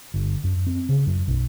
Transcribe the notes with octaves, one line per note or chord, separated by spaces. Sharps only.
G1
F#2
C4
C#3
F#2
B1